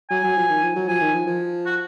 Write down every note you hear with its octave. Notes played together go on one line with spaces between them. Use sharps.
F#3 G#5
F#3
F3
D#3
F3
F#3
F3 G#5
D#3
F3
F3
F#4